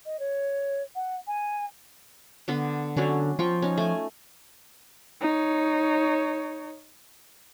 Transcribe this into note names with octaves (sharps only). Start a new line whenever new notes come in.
D#5
C#5
F#5
G#5
D3 B3 D4
D3 F#3 C#4 D4
F3 F4 G5 C#6
C#4 D#4
A3 G#5
D#4 C#5